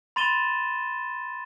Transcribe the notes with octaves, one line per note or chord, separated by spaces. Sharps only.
B5 C6 A6 D#7 E7 G7